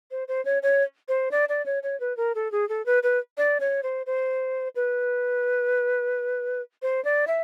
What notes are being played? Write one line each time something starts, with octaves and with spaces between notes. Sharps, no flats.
C5
C5
C#5
C#5
C5
D5
D5
C#5
C#5
B4
A#4
A4
G#4
A4
B4
B4
D5
C#5
C5
C5
B4
C5
D5
E5